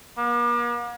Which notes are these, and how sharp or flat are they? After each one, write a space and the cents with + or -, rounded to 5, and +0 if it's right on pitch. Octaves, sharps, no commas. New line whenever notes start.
A#3 +45